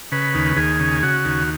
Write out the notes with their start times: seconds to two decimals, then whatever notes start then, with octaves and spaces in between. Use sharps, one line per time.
0.12 C#3 B4
0.34 D#2
0.57 D#2 G#4
0.80 C#3
1.03 C#3 F#4
1.25 D#2